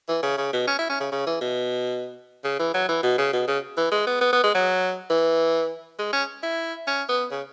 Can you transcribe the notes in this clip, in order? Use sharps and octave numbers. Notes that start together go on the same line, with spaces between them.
E3
C#3
C#3
B2
C#4
E4
C#4
C#3
C#3
E3
B2
C#3
E3
F#3
E3
B2
C#3
B2
C#3
E3
G#3
B3
B3
B3
G#3
F#3
E3
G#3
C#4
E4
C#4
B3
C#3